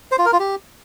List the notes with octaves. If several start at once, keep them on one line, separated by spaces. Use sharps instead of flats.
C5
F4
A#4
F4
G4